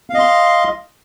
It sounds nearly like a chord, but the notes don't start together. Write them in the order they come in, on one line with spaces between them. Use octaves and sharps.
F5 D#5 C6